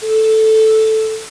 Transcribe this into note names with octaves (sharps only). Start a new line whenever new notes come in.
A4